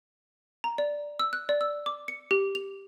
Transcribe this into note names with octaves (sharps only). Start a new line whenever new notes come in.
A#5
D5
E6
F#6
D5
E6
D6
C#7
G4
F7